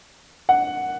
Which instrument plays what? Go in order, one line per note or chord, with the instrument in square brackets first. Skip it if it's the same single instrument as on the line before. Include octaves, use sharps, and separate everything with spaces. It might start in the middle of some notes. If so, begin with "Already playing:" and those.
[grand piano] F#5